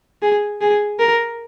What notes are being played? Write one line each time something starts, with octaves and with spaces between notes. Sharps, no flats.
G#4
G#4
A#4